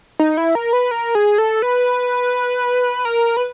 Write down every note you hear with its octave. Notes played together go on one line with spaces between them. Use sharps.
D#4
E4
A#4
B4
A#4
G#4
A4
B4
A#4
B4